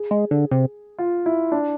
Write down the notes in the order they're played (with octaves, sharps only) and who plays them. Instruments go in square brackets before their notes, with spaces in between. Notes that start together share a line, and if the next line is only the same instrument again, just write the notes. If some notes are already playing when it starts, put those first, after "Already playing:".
Already playing: [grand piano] G#4
[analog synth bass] G#3
D3
C3
[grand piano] F4
E4
D4